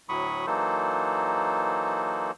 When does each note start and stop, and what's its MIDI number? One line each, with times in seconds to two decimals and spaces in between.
0.09 0.46 38
0.09 0.46 45
0.09 0.46 54
0.09 0.46 83
0.09 0.46 85
0.09 0.46 87
0.47 2.32 52
0.47 2.32 54
0.47 2.32 58
0.47 2.32 63
0.47 2.32 69
0.47 2.32 72